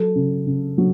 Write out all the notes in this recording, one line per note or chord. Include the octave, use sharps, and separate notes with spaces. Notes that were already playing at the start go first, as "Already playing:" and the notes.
Already playing: F#3 A4
C#3
C#3
F#3